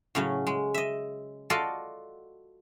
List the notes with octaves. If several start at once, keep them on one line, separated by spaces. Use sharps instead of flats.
A2 C#3 F#3 C#4
G#3
D#5 E5
F4 F#4 A4 D5 D#5 F5